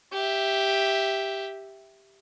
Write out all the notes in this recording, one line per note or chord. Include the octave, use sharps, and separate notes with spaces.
G4 E5